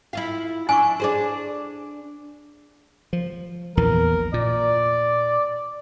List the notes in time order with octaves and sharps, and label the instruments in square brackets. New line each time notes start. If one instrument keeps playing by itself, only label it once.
[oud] E4 F4 F5
[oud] D4 E4 [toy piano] G#5 C#6
[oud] D4 G#4 C5
[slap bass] F3
[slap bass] A#1 E2 E3 [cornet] A#4
[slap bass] A#2 [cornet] D5